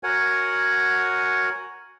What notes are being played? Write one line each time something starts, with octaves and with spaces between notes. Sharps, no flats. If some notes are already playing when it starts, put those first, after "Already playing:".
F#4 A#4 C#5 F#5 G#5